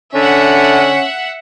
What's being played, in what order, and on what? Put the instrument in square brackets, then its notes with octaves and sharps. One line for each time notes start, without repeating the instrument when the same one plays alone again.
[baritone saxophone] D3 [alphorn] C#4 [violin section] E5 F#5